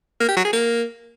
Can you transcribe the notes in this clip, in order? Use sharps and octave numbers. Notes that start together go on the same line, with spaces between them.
A#3
G4
F#3
G#4
A#3